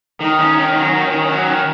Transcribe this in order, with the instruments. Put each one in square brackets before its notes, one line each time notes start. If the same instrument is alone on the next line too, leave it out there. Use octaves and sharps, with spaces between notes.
[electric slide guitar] D#3 [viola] D#4
[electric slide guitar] C#4
D#3
[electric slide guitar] F#3 [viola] C#4
[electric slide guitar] D#3
D#3
F#3
D#3